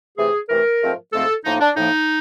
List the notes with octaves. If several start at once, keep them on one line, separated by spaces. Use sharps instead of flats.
C3 E3 A3 G#4
C3 E3 A3 A#4
G#2 F3 A3 C4
G#2 F3 A3 C4 A4
A2 F3 A#3 D#4
D4
A2 F3 A#3 D#4